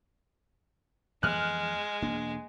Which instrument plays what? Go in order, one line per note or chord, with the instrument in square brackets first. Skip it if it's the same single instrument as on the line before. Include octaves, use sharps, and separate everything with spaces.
[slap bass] F2 E3 B3 [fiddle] G#3 [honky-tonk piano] F6 F#6
[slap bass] E1 A#3 D4